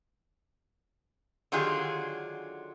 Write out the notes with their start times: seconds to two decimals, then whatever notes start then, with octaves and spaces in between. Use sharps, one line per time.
1.52 D3 D#3 F#3 F4 G4 G#4